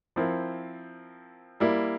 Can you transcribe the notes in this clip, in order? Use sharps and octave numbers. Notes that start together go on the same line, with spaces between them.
F3 C4 E4 A#4
G3 A#3 E4